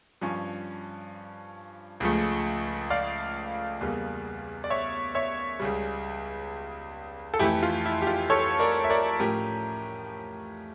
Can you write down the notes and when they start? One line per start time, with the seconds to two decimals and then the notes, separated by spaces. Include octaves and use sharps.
0.21 G2 F3 C#4
2.00 C#2 C#3 F3 A3
2.90 D5 F5
3.81 E2 C#3 G3 A#3
4.64 D5
4.70 C#5 E5
5.15 C#5 E5
5.60 C#2 C#3 G3
7.34 A4
7.39 F2 E3 A3 E4 G4
7.63 F4
7.85 E4
8.02 G4
8.07 F4
8.30 A4 C#5
8.60 A#4 D5
8.84 E5
8.90 A#4 D5
9.19 A2 F3 C#4 G4 A#4